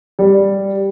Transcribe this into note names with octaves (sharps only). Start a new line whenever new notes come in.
G3